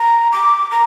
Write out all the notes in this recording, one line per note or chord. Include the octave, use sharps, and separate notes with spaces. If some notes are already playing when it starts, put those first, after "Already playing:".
Already playing: A#5
D6
A#5